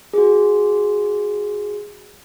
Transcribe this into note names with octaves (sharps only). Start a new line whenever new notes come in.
F#4 G#4